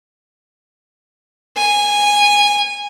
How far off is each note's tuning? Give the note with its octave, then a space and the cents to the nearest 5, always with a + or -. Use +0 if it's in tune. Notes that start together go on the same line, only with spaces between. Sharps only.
G#5 -15